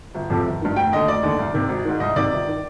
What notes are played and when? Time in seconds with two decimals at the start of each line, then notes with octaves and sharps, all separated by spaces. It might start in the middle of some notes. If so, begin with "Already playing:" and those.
0.15 G1
0.30 F2 C3 F3
0.46 G1
0.61 G2 D#3
0.76 F1 G5
0.92 D#2 D3 D#5
1.08 F1 D5
1.23 D#2 D3
1.38 C2
1.53 C3 D#3
1.69 G#1
1.85 G#2 D#3
2.00 C2 D#5
2.16 C3 D#3 D5
2.32 G1
2.48 D#3